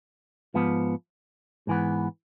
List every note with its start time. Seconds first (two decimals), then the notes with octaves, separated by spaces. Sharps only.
0.54 G#2 F3 B3
1.67 G#2 E3 B3